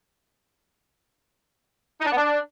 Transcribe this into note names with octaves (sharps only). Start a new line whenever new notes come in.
D#4
D4
B3
D4